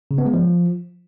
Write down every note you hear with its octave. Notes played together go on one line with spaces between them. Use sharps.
C#3
B3
G#3
F3